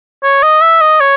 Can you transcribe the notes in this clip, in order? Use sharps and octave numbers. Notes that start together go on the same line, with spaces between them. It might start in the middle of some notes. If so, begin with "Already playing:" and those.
C#5
D#5
E5
D#5
C#5